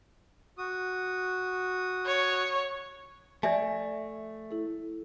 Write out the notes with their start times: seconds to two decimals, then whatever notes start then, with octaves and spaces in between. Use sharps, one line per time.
0.58 F#4 D#6
2.06 C#5
3.43 F3 A3 D5 E5 G#5
4.51 E4 A4